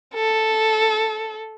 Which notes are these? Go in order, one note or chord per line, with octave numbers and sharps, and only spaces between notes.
A4